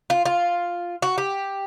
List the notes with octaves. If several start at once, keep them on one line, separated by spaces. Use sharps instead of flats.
F4
F4
F#4
G4